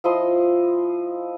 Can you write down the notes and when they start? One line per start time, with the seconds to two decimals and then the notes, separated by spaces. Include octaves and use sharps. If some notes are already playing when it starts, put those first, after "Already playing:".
0.04 F3 E4 D#5 C6